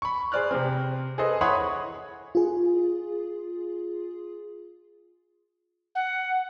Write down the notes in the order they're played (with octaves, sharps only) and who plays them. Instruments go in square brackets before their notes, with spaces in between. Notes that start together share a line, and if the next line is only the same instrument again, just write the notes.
[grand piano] B5 C#6
G#4 C5 D5 F6 F#6
C3 C4
G#4 A4 B4 C5 D#5
E4 C#5 F#5 B5 C6 D#6
[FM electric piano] F4 G#4
[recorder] F#5